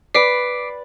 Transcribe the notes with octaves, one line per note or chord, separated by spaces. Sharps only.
B4 D5 D6 B6 C7